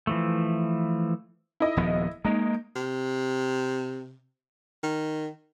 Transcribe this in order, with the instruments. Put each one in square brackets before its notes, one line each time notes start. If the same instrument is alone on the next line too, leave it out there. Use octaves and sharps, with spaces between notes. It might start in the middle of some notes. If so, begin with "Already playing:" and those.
[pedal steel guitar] E3 F3 A3
[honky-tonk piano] E4 D#5
[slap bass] D#1 F3 B3
[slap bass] G#3 A#3 [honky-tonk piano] D#4
[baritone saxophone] C3
D#3